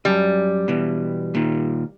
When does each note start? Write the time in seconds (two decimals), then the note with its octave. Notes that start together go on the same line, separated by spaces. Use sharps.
0.05 F#2 G3
0.68 B2 E3
1.35 A#2 D#3